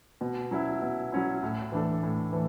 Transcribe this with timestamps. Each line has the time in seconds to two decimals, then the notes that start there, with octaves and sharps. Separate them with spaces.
0.21 B2
0.51 F#3 C#4 E4
0.82 B2
1.12 F#3 C#4 E4
1.43 A2
1.72 E3 A3 D4 A4
2.03 A2
2.33 E3 A3